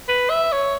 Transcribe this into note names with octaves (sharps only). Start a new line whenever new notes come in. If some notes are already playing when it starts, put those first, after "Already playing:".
B4
E5
C#5